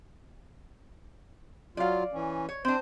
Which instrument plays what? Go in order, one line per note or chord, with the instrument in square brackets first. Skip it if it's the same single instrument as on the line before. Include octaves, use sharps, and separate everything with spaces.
[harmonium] F#3 F4 [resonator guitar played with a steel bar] D5 F5
[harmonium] E3 C#4
[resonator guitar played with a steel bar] C#5
[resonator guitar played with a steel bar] C4 D4 [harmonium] C5